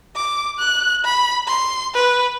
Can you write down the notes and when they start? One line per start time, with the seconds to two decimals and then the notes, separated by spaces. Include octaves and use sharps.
0.15 D6
0.59 F#6
1.05 B5
1.47 C6
1.94 B4